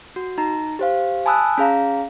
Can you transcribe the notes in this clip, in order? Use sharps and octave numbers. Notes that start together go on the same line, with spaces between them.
F#4
D#4 A#5
G4 C5 F5
G#5 A5 B5 D#6 E6 F#6
C#4 G#4 F5 A#5